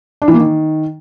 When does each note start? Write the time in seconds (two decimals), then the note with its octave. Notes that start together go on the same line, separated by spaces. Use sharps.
0.22 D4
0.28 E3
0.34 A#3
0.40 D#3